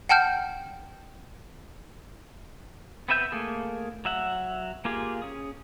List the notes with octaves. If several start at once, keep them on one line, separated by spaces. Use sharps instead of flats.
F#5 G5 A5 F6 G6
B3 C4 B4 E5 G6
A3 A#3 G#4
F#3 E5 F#5
A#3 F4 G4 G#4
C#4 G#4